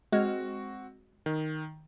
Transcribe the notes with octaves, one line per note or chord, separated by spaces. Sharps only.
G#3 C4 F#4 F6
D#3